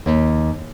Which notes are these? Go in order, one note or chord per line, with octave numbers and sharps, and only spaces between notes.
D#2